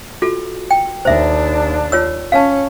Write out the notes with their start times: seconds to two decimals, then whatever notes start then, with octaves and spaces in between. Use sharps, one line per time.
0.22 F4 F#4 A4
0.71 G5
1.05 D#2 D4 C5 E5
1.92 F4 C#5 E6
2.32 C#4 F5 A5